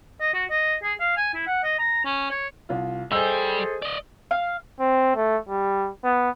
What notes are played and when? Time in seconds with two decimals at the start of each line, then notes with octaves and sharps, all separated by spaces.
0.20 D#5
0.34 F#4
0.50 D#5
0.83 G#4
1.00 F5
1.17 G#5
1.34 E4
1.47 F#5
1.63 D#5
1.78 A#5
2.05 C#4
2.30 C#5
2.69 C2 F4
3.12 G3 G#4 A4 C5 D#5 G5 G#5 E6
3.82 D5 D#5
4.31 F5
4.80 C4
5.16 A3
5.49 G3
6.04 B3